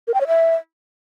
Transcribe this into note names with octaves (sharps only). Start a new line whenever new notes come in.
A#4
G5
C#5
E5